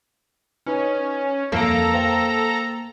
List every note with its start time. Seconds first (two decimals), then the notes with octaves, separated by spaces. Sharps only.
0.66 C#4 D#4 B4
1.52 F2 F3 A#3 A4 A#5 D7
1.94 C5 F5 G5